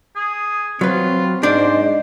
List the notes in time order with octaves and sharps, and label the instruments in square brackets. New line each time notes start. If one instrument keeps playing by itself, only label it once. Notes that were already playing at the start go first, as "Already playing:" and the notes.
[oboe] G#4
[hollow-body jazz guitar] F#3 B4 [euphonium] C4 [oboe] F4
[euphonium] G#2 [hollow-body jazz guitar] D4 D5 [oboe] C5 [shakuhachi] D#5